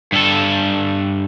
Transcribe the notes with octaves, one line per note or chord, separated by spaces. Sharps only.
G2 A4